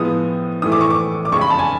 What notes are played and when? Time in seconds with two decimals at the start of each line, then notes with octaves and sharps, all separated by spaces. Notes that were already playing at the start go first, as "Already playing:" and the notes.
Already playing: A2 F3 G#3 B3 D#6
0.62 A2 E3 A3 D#6
0.72 D6
0.81 C#6
0.90 D6
1.25 D6
1.32 F2 C#3 F3 G#3 C#6
1.41 B5
1.50 A5
1.59 G#5